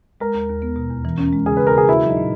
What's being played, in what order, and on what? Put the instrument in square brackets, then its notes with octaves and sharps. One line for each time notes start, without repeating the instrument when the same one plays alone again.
[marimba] G#3 [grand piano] A#4
[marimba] D#2
D#2
B3
B2
E2
E3
C#4
G#3
[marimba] C#3 [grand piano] G#4
[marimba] C#3 [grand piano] B4
[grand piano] A#4
[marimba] C#3 [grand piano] G#4
[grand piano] E4 [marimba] F#4
[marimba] F#3
[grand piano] D#4
[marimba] A#2